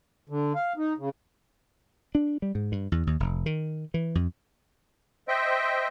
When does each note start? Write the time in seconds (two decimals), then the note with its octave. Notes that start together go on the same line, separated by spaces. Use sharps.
0.29 D3
0.55 F5
0.77 D#4
0.97 C#3
2.15 D4
2.42 G3
2.55 G#2
2.72 G2
2.92 E2
3.07 D#2
3.20 F1
3.46 D#3
3.94 E3
4.15 F2
5.28 C5 D#5 E5 G5